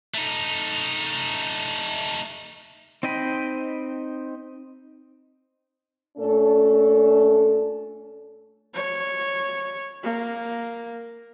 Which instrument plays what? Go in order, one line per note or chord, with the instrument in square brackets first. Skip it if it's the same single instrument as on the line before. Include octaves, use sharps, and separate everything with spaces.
[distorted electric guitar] A3 D#4
[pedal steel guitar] C4 D#4 D#5 G5 B5
[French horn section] A#2 A3 C#4 D4 A4
[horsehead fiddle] C#5
A#3